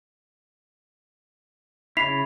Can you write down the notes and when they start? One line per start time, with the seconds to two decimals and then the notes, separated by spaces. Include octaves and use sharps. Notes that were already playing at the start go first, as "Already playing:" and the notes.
1.97 C#3 E4 B6 C7 F7